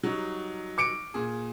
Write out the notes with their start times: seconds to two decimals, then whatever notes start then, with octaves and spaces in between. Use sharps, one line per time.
0.03 F#3 G3 D#4
0.78 D6 C#7 D7
1.14 A#2 G#4